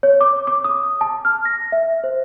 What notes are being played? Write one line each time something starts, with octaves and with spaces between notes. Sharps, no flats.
C#5
D6
D6
D#6
A5
F6
A#6
E5
C5